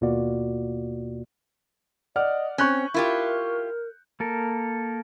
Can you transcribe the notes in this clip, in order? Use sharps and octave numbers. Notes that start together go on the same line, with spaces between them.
D#2 B2 A#3 F4 F#4 D5
D5 D#5 F#5 F6
C4 C#4 C#6 F#6 G6
E4 F4 G4 A#4
A#3 A4 A#4